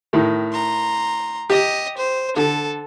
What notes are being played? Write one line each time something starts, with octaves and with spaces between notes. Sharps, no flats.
A2 D#3
A#5 C6
G4 D#5
C5
D3 A4